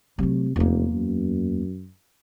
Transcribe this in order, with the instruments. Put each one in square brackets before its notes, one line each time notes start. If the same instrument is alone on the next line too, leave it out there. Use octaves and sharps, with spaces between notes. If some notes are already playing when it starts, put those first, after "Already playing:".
[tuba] C3 [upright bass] F#3 A3
[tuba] F1 [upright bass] E2 A#3
[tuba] F#2